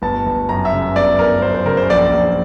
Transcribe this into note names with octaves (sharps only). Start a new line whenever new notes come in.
G1 A5
G1
F#2 A#5
E5
C#3
G1 D5
G1 A#4
F#2 C5
C5
C#3 A#4
C5
A#1 D5
A#1